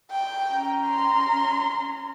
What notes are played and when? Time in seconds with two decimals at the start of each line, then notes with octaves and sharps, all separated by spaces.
0.11 G5
0.51 C#4 A#5
0.86 C6